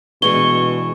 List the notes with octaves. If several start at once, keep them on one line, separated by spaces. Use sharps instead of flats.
B2 E3 G#3 D4 C#6 G7